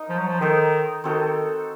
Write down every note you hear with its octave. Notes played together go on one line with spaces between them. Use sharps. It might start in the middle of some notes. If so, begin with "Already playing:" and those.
Already playing: D#4 A#4 D#5
F3
F#3
F3
D#3 D#4 A4 C5 D#5
D#3 C4 D#4 F#4 A4